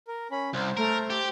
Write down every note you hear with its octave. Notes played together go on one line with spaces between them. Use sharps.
A#4
C#4 B5
C2 C5
A3 A#4
G4